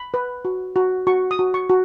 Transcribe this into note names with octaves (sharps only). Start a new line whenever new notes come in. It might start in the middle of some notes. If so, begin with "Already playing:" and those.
Already playing: B5
B4
F#4
F#4
F#4 C#6
D#6
F#4
C#6
F#4